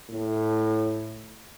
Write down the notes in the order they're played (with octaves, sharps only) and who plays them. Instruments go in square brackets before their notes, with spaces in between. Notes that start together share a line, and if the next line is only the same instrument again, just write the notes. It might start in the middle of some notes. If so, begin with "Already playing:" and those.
[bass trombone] A2